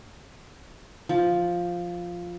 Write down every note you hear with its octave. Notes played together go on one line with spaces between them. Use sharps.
F3